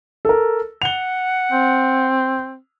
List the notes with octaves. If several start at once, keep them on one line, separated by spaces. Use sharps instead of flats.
A4 A#4
F#5 F7 G7
C4